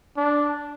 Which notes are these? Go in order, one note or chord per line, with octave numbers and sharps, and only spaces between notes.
D4